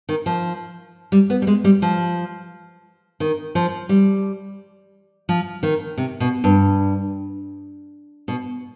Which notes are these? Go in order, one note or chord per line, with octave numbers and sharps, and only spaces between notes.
D#3
F3
G3
B3
G3
G#3
G3
F3
D#3
F3
G3
F3
D#3
C3
B2
G2
B2